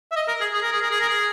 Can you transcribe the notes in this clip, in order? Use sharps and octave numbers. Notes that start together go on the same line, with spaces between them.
E5
D#5
A#4
G#4
G#4
A#4
G#4
A#4
G#4
A#4
G#4